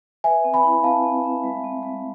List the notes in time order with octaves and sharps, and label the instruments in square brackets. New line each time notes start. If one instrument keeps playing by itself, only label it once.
[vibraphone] B4 [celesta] E5 G#5
[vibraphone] C4
[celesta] G#5 B5
[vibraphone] E4
[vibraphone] C4 [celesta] F5 A5
[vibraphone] C4
E5
G#3
C4
G#3